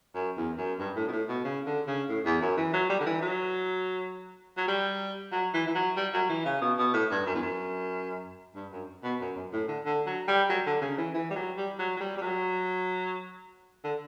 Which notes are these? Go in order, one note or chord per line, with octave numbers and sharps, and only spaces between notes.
F#2
E2
F#2
G2
A2
B2
A2
B2
C#3
D3
C#3
A2
E2
F#2
E3
F#3
G3
D3
E3
F#3
F#3
G3
F#3
E3
E3
F#3
G3
F#3
E3
C#3
B2
B2
A2
G2
F#2
E2
F#2
G2
F#2
B2
F#2
F#2
A2
D3
D3
F#3
G3
F#3
D3
C#3
E3
E3
G3
F#3
G3
F#3
F#3
G3
G3
F#3
D3